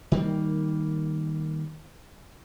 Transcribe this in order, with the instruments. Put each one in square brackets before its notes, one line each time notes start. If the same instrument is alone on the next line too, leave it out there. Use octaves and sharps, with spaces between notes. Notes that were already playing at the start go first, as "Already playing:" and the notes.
[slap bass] D#3 G3 A#3